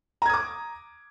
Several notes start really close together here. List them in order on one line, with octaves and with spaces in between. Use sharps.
A#5 G#6 D#6 D6